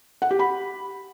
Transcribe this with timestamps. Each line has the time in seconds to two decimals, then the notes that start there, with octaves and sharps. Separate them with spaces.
0.22 F#5
0.31 G4
0.39 B5